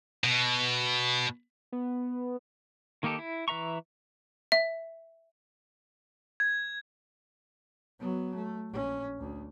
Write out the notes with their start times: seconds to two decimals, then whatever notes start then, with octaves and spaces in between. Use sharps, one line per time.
0.24 B2
1.72 B3
3.03 D#3 A#3 D#4 G4 A4
3.19 E4
3.48 E3 B4 E5 A#5 C#6
4.52 E5
6.40 G#6
7.99 F#3 B3
8.35 A3
8.70 A#1 C#4
9.19 D2